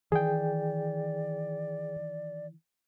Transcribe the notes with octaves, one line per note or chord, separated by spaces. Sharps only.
D#3 E3 G#4 D5 G5